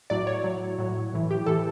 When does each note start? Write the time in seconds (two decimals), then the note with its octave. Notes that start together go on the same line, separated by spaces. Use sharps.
0.10 A2 F#3 D5
0.27 C#5
0.44 A2 F#3
0.78 A2 F#3
1.13 A2 E3
1.31 G4
1.46 A2 E3 A4